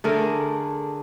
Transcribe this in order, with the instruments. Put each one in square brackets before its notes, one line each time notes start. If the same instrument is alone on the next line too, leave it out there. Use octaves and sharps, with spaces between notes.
[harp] D3 D4 G#4 [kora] A3 A#4